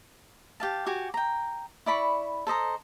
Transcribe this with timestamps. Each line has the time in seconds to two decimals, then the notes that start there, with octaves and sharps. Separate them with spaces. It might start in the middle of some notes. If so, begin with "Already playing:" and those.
0.60 G4 F5 A5
0.86 F#4 G4 G#5
1.14 G5 A#5
1.86 E4 D5 B5 C#6
2.47 A4 C5 D#5 A#5